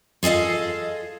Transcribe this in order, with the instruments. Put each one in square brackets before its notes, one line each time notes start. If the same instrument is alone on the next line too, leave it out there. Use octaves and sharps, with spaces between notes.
[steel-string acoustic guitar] F4 G#4 A4 D#5 F5